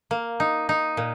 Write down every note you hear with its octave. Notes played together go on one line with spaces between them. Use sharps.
A#3
D#4
D#4
A#2